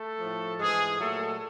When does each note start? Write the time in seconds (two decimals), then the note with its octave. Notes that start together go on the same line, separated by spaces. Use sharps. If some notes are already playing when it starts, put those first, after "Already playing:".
Already playing: A3 A4
0.21 A2 F3
0.60 G#2 E3 G#3 G#4
0.98 A#2 F#3 A3 A4